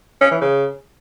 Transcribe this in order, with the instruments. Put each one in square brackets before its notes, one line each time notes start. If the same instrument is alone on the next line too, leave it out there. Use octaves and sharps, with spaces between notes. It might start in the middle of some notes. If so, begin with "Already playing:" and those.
[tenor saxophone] C#4
E3
C#3